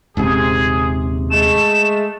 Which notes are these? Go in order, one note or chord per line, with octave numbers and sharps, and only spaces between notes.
D#1 G#2 C3 G#4
G#3 A3 E7